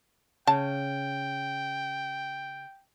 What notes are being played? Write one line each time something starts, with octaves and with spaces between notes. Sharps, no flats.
C#3 G5 A5